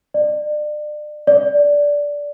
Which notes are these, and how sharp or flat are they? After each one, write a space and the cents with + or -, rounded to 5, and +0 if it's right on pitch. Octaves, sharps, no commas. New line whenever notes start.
D5 +35
D5 -10